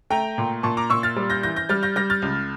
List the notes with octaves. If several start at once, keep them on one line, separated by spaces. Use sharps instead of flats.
A3 G5 A#5
A#2
A#2 A5 C#6
A#5 D6
A#2 C#6 E6
F6 A6
G3
G6 A#6
E3 G6 A#6
G6 A#6
G3 F6 A6
G6 A#6
G3 G6 A#6
F6 A6
C#2